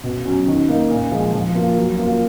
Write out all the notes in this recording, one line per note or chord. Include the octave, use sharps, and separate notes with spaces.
B2
F#3 C#4
D#3
A#3 D#4
A#2
F3 G#3
F3
A#3 F4
F#3
A#3 F4